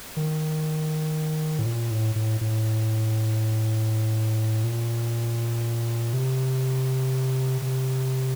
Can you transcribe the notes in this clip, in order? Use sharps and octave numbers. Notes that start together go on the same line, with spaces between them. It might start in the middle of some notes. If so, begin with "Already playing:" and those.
D#3
A2
A#2
A2
A2
A2
A#2
C3
C3